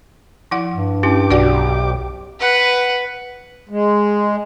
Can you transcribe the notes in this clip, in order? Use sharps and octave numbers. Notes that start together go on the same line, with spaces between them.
F3 E4 F#5
G2
C#4 E4 G4 D6
B1 F#4 D5 F#5
B4 F#5
G#3